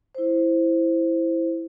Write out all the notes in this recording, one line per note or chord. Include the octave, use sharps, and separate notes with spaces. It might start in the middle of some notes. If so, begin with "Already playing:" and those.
E4 C5